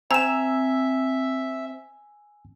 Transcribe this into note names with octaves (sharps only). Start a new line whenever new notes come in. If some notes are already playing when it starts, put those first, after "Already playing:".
C4 E5 G#5 A#5 E6 G#6 E7